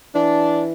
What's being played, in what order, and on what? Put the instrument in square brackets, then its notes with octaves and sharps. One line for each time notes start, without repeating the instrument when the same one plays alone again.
[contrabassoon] E3 [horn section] D4